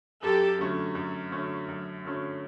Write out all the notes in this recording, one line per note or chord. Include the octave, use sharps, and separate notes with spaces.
F#2 G4 A4
D3 F#3 A3 C#4
F#2
D3 F#3 A3 C#4
F#2
D3 F#3 A3 C#4